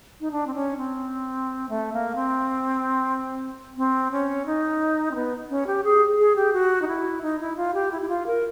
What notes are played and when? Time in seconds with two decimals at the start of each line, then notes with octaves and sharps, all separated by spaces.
0.20 D#4
0.31 D4
0.47 C4
0.55 C#4
0.77 C4
1.69 A3
1.93 A#3
2.15 C4
3.77 C4
4.12 C#4
4.46 D#4
5.11 C4
5.15 B3
5.50 C#4
5.67 G4
5.84 G#4
6.19 G#4
6.36 G4
6.53 F#4
6.82 D#4
6.88 E4
7.22 D#4
7.40 E4
7.57 F4
7.74 G4
7.92 E4
8.02 E4
8.09 F4
8.27 A#4